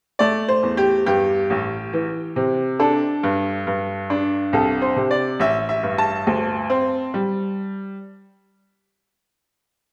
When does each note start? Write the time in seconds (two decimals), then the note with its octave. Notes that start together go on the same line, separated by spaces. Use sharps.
0.19 A3 D5
0.48 C5
0.63 E2
0.77 G4
1.06 G2 G4
1.50 A1
1.93 E3
2.36 C3
2.79 D4 A4
3.23 G2
3.67 G2
4.10 D4
4.53 C2 A4
4.82 C5
4.96 C3
5.11 D5
5.40 A1 E5
5.69 E5
5.83 G2
5.98 A5
6.27 D2
6.70 C4
7.14 G3